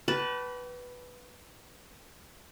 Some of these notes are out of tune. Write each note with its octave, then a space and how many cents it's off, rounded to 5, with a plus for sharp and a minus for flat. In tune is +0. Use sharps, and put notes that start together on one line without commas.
G4 -40 B4 +0 A5 +0